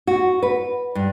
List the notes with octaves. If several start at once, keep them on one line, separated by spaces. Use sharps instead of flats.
F#4
B4
G2